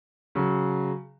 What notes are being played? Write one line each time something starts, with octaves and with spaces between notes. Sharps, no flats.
C#3 F#3